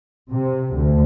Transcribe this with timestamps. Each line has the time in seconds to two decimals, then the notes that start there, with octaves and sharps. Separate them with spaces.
0.31 C3
0.74 D2